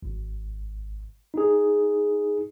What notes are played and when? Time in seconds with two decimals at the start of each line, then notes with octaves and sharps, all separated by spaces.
0.03 G#1
1.34 D#4 G#4